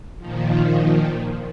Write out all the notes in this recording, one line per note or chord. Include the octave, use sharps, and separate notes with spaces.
A#2 D#3 F3